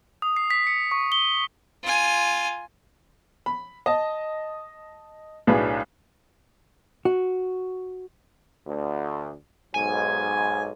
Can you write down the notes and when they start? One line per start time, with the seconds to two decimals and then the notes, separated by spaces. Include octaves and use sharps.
0.22 D#6
0.36 C7
0.50 B6
0.67 C#7
0.92 C#6
1.12 G7
1.84 F4 G#5
3.46 B5
3.86 D#5 A5
5.47 B1 A2 D4 G#4 B4
7.05 F#4
8.66 D2
9.74 B1 G#2 G#5